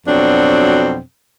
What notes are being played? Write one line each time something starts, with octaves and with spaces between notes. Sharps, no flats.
F2 B2 F#3 C4 D4